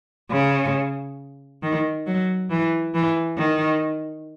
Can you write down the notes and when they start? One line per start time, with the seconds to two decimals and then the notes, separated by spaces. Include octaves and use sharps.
0.31 C#3
1.62 D#3
2.07 F#3
2.50 E3
2.94 E3
3.38 D#3